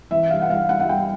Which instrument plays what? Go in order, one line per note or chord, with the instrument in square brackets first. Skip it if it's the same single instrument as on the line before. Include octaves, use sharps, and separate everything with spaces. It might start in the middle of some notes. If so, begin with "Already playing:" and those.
[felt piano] E3 E5
G2 F5
F#5
G2 F5
G2 F#5
F#5
G3 G5